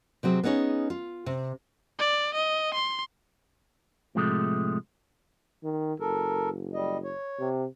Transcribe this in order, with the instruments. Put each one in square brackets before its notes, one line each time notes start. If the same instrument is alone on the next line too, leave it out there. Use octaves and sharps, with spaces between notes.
[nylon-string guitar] C3 F#3 C4 G#4
B3 C#4 D#4 G#4 C#5
F4
C3
[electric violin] D5
D#5
C6
[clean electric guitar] A2 C3 F3 G#3 A3
[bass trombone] D#3
[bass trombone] F#1 [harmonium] A4 A#4
[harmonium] G3 D#5
C#5
[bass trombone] C3